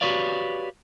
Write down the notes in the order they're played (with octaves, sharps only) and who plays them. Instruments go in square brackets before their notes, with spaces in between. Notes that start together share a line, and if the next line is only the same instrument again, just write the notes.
[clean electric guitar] F#4 G4 B4 C#5 D5 F5